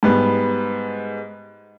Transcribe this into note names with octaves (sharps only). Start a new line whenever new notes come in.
G#2 G3 B3